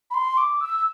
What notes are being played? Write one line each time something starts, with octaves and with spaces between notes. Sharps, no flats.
B5
C6
D6
E6